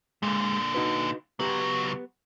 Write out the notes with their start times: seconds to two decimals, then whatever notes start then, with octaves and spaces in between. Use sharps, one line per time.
0.23 A#2 D3 G#3
0.75 D#4 F#4 B4
1.40 C#2 F#3 B3 G4 A#5